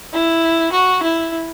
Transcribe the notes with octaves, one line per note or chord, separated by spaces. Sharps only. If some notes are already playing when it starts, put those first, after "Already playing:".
E4
F#4
E4